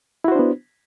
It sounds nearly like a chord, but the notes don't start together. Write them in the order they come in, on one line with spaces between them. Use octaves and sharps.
E4 F#4 C5 D4 B3